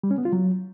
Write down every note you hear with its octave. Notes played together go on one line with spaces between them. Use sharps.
G3
C#4
B3
F4
F#3